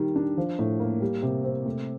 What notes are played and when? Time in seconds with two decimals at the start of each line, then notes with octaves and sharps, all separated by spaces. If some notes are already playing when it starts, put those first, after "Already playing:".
Already playing: D#3 G3
0.16 D4
0.38 F3
0.59 A2
0.80 A#3
1.01 G3
1.23 C3
1.44 C4
1.66 A3